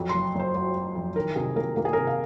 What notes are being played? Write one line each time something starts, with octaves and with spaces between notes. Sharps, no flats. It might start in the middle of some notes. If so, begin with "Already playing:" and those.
Already playing: F2 F#3
F#1 C6
F#1 C5
F#3 C5
F#3
F2
D#3 A#4
C3 G#4
A#3 A#4
A#3 A#4
G#4
C3 A#4
F5